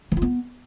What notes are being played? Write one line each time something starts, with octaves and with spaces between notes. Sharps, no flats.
E3
F4
B3